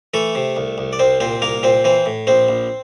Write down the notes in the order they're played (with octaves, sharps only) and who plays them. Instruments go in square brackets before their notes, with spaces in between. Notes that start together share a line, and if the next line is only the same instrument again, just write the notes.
[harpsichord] E3 A3 A4
C3
C2
C2
D5
C2 C4 C5
A#2 C4 C5
C2 A#3 A#4
A#2 C4 C5
E3 C4 C5
A2
A#1 C4 C5
A#1